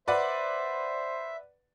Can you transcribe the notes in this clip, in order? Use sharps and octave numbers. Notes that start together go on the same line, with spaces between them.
B4 C5 D5 E5 F#5